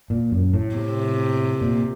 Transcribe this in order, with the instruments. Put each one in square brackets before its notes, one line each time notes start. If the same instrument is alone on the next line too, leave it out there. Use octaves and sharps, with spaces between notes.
[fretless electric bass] A#2
F#2
A2
[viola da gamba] C3
[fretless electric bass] A#2